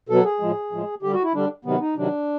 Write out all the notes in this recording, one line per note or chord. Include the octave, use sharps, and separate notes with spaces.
B2 F#3 A4
G#4
A2 F3 G#3
A2 F3 G#3
D3 G3 G4
F#4
E4
D3 G3 D4
C3 D#3 F#3 B3
D#4
C3 D#3 F#3 D4